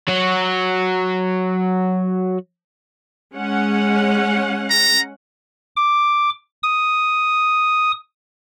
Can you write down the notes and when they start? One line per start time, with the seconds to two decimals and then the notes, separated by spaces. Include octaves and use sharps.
0.08 F#3 F#4
3.35 G#3 C#4 F#5
4.71 A#5
5.76 D6
6.63 D#6